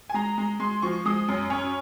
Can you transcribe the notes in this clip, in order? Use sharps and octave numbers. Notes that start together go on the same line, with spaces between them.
G#5
G#3 A#5
G#3
G#3 C6
F3 C#6
G#3 D#6
F#2
C#4